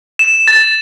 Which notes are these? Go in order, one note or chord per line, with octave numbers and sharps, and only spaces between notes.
E7
A6